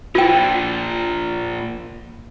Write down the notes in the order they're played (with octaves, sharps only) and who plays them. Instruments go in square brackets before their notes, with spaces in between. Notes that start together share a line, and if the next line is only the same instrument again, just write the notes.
[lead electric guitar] A#2 F3 [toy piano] F4 G5